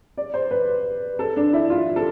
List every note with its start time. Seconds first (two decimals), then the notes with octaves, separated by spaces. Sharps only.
0.17 D5
0.34 C5
0.51 B4
1.19 A4
1.36 D4
1.53 E4
1.70 F4
1.96 A4